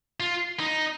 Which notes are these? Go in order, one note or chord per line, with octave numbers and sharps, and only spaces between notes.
F4
D#4